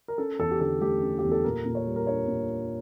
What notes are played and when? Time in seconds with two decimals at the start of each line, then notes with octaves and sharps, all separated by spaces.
0.08 A#4
0.18 C#4 A4
0.39 E2 A4
0.51 G4
0.60 D3 A4
0.81 A3 G4
1.02 C#4
1.19 E2 G4
1.32 A4
1.44 A#2 A#4
1.65 A#2
1.75 C#5
1.86 G3
1.96 A#4
2.07 D4 C#5
2.28 A#2